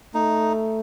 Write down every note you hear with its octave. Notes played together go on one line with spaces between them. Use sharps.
A3 D#4